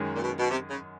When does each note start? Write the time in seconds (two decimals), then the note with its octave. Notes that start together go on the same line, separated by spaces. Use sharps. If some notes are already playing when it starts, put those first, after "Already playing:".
Already playing: F#2 D#3 G#3
0.16 A#2
0.22 B2
0.39 B2
0.51 C3
0.70 C#3